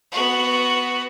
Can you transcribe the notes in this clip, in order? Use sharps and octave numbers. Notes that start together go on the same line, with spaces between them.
B3 F#4